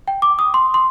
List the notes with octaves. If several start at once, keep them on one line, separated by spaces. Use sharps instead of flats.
G5
D6
D#6
C6
C6